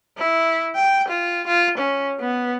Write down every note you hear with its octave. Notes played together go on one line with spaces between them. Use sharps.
E4
G5
F4
F4
C#4
B3